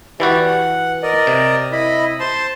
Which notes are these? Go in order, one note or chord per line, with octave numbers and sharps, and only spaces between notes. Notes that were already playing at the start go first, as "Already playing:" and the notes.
E3 E4 F#4 G4 D5
F#5
A#4 D5 D#5
C3
E4 D#5 B5
C5 A5 C6